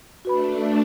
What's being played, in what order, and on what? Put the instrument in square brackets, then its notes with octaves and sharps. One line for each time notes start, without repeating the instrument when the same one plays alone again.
[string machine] A3 D4 [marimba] F#4 B4 B5